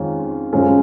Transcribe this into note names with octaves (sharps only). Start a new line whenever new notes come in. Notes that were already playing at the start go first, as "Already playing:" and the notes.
Already playing: F2 D#3 G#3 C#4 F4
F#2 C#3 F3 G#3 C#4